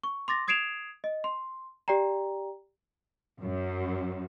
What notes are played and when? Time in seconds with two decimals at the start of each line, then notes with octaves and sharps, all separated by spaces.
0.03 C#6
0.28 C6 D6 A6 A#6
0.48 D#6 G#6 C7 D7 E7 F7
1.04 D#5
1.24 C6
1.88 G4 D5 G5 A#5
3.40 F#2